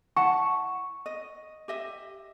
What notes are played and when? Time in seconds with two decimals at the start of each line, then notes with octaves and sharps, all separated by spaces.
0.17 E4 F#5 A5 C#6
1.06 D#5
1.68 G4 D#5 E5